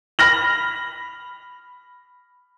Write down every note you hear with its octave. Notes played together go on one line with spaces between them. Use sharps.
B5 F6 A#6 F#7